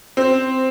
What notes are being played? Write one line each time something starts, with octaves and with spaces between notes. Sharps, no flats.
C4